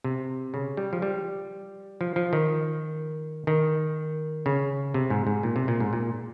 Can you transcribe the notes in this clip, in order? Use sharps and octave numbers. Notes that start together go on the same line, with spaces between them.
C3
C#3
G3
F3
G3
F3
F3
D#3
D#3
C#3
C3
G#2
G#2
A#2
C3
A#2
G#2
A#2